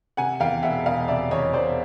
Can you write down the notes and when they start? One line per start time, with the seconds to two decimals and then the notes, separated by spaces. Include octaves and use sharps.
0.17 C3 F#5 G#5
0.40 E2 F5 G5
0.63 E1 E5 F#5
0.85 E1 D#5 F5
1.08 C3 D5 E5
1.31 E2 C#5 D#5
1.53 E1 C5 D5